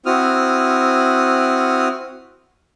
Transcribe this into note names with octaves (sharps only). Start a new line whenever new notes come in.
C4 E4 F#4 D#6 F6